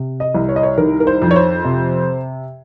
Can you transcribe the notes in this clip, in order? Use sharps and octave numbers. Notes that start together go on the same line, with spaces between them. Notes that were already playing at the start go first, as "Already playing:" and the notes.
Already playing: C3
D#5
C2
C#5
D#5
C#5
D#3 A#4
A#4
C5
F2
C#5
C5
C3